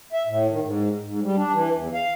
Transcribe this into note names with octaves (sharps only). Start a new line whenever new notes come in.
E5
A2
D#3
G#2
G#2
G3
D4
E3
E2
F5